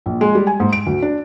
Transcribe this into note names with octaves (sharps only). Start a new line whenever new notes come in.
A#1
G#3
G3
G#5
G#2
D7
D2
D4